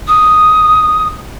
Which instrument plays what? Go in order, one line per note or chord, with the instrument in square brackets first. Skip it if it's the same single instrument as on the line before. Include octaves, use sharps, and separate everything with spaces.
[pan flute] D#6